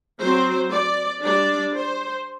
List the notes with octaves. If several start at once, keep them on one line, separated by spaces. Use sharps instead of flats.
F#3 C4 C5
D5
G3 D4 D5
C5